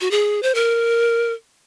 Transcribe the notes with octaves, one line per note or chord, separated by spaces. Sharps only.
F#4
G#4
C5
A#4